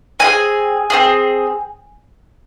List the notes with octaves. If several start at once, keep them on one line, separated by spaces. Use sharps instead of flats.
C4 E4 G#4 G#5
C4 E4 G#4